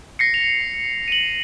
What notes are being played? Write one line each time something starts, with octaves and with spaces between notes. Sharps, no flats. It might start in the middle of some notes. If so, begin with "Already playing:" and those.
A#6 C7 C#7
F7
D#7 F#7